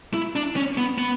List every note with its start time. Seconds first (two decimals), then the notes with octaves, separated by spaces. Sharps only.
0.14 E4
0.36 D4
0.56 C#4
0.78 B3
0.98 B3